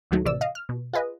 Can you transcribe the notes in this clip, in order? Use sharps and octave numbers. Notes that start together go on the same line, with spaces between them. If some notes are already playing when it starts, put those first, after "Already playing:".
D2 A#2 D#3 F#3 A3
A1 C3 E3 D5 E6
D#5 F5
F6
B2
F4 G#4 B4 D#5